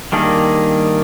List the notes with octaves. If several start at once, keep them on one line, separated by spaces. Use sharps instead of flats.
D#3 G3 A#3 D4 G#4